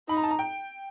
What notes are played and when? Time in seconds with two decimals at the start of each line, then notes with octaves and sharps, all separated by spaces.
0.09 D#4 B5
0.17 A#5
0.23 A5
0.31 A#5
0.39 G5